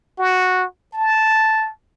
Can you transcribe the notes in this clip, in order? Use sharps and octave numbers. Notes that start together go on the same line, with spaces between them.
F#4
A5